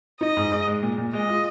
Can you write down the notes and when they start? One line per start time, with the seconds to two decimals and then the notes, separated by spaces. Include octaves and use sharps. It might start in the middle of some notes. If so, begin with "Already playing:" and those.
0.21 D#4 D#5
0.37 G#2
0.52 G#2
0.67 G#3
0.83 A#2
0.98 A#2
1.13 G#3 D#5
1.29 F4